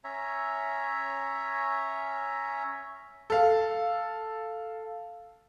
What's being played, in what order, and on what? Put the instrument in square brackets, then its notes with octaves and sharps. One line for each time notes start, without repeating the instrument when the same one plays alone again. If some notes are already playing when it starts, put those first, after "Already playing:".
[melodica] C#4 C#5 E5 A#5
[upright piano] A4 F5